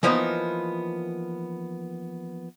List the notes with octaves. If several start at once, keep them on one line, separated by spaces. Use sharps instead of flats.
E3 F3 A#3 B3 D#4